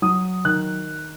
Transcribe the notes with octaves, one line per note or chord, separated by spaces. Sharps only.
F#3 D#6
D#3 F#6